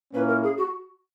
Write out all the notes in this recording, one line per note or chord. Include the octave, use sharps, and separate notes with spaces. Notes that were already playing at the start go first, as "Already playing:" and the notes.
A#2 A#3 C#4 E4 B4
A#4
G#4
F#4